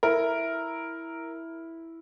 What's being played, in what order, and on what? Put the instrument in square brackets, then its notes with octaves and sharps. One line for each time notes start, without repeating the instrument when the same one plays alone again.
[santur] E4 [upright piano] A#4